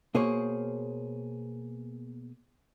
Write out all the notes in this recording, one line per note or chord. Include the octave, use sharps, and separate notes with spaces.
B2 A#3 G#4 C5 C#5